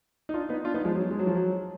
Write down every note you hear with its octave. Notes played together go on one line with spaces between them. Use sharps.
D#4
D4 F4
B3 D#4
D4 F4
B3 D#4
F3 G#3
F#3
G#3
F#3
F3
F#3